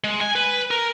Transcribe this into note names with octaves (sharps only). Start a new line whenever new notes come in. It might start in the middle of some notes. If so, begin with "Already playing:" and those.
G#3
G#5
B4
A#4